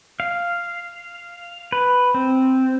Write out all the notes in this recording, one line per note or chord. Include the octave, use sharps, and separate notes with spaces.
F5
B4
C4